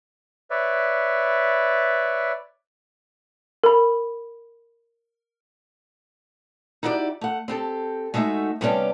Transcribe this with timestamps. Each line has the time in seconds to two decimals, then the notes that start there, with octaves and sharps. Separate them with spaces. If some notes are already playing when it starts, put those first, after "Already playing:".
0.50 B4 C#5 D5 E5
3.64 A#4 B5
6.83 D#4 E4 F#4 G4 B4 D5
7.21 A3 F#5
7.48 C4 G4 A4
8.14 G#3 A3 D#4 F#4 E5
8.61 C3 G3 B3 C#4 D4 G4